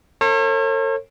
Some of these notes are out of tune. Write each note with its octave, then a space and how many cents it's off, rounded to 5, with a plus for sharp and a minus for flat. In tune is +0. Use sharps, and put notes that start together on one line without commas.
A4 +45 C#5 -40